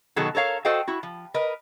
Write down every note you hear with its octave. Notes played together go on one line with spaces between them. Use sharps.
B2 D#3 F#3 F#4 G#4 A4
A4 A#4 C#5 F5
F#4 A4 C5 D#5 F5 G5
E4 F#4
F3
A#4 B4 D#5